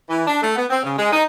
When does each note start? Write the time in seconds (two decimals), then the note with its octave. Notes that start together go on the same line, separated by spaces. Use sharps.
0.09 E3
0.26 D4
0.41 A3
0.56 B3
0.70 C4
0.83 C#3
0.97 G#3
1.12 D#4